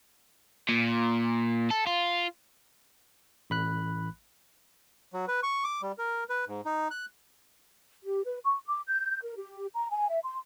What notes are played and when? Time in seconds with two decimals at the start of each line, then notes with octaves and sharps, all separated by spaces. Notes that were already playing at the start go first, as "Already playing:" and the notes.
0.69 A#2
1.70 A4
1.87 F4
3.50 A1 B5 F#6
5.13 F#3
5.28 B4
5.43 C#6
5.64 D6
5.82 G3
5.98 A#4
6.29 B4
6.47 G#2
6.65 D#4
6.91 F#6
8.05 G4
8.25 B4
8.45 C#6
8.67 D6
8.88 G6
9.23 A#4
9.37 G4
9.75 A#5
9.91 G#5
10.10 E5
10.24 C6